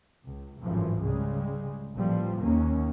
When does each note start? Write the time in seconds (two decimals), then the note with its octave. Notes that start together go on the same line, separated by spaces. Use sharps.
0.25 C#2
0.62 G#1 F#2 A2 E3 F3
1.01 C#2 C#3 G3 G#3
1.93 A1 A#2 F3 G3
2.42 D#2 A#3 C#4